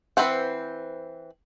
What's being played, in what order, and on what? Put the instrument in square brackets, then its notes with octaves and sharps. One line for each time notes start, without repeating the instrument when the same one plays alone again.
[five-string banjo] E3 C4 B4 C5 F#5